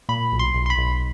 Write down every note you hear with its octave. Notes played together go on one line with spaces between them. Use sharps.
A#2 B5
B1
C6
B1
C6
B5
B1